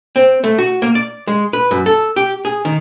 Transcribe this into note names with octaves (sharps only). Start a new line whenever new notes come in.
C4
A3
F#4
A#3
D5
G#3
B4
F#2
A4
G4
G#4
D#3